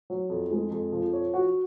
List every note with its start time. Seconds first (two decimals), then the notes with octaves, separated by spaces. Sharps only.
0.10 F#3
0.29 F2
0.51 G#3
0.71 F2
0.92 F3
1.13 C#5
1.34 F#4